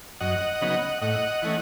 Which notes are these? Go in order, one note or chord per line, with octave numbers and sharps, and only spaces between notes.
F#2 D#5 F#5
C#3 F#3 B3 D#4
A2 D#5 F#5
E3 A3 C#4